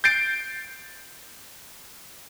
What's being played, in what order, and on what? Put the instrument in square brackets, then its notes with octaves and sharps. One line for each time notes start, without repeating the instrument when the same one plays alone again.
[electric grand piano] G6 A6 C7 D7